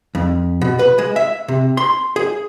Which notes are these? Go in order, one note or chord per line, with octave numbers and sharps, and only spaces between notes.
F2
B2
B4
G#3
E5
C3
C6
G#4